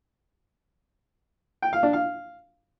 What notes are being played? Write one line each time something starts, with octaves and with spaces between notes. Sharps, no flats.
G5
F5
D4
F5